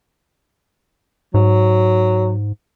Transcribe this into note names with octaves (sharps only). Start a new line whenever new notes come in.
G#2 F#3